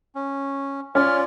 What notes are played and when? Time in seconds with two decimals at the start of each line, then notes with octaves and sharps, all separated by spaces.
0.15 C#4
0.95 C#4 F4 D5 F6